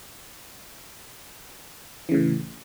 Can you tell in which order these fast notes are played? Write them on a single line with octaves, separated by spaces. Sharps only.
E3 C#3 A2